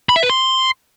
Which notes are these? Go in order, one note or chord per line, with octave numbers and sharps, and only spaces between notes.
B5
E5
B4
C6